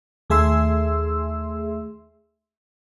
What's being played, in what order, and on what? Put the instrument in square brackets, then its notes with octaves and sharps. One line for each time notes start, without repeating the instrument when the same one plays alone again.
[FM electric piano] D#2 A3 G#4 E5 C6 E6